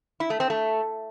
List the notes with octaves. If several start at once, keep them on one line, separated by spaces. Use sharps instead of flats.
E4
A3
C4
A3